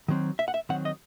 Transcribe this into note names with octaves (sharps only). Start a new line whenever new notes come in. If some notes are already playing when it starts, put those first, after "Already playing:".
D#3 F#3 C4
E5
F#5
E5
D#3 F#3 C4 F#5
D#5